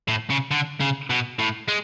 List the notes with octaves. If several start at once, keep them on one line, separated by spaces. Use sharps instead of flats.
A2
C#3
D3
C#3
B2
A2
G#3